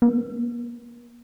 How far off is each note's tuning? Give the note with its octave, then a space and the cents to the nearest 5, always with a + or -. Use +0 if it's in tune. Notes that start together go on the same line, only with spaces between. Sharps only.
A#3 +40